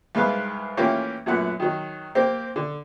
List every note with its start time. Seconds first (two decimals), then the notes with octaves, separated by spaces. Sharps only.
0.15 C2 G#2 B4 F5
0.77 E3 A3 A#3 C#4 F4 G4
1.26 F#2 A#2 F#3 A3 B3 F#5
1.60 D#3 F#3
2.15 A#3 C4 G4
2.56 D3